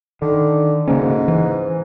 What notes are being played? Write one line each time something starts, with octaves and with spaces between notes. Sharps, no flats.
D3 D#3
G#2 C#3 A#3 C#4
E3